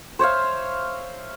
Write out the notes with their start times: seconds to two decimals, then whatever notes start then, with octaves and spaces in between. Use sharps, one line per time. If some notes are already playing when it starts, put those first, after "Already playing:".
0.19 C5 C#5 E5 F5